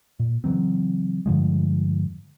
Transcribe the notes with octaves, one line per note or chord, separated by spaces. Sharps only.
A#2
C#3 E3 F#3 C4
G2 D3 F3 G#3